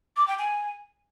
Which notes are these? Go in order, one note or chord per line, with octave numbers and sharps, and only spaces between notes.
D6
G5
G#5